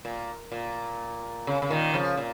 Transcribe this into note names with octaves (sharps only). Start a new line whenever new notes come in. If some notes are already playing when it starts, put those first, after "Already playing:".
A#2
A#2
C#3
C#3
A#2 D#3
C#3 F3
A#2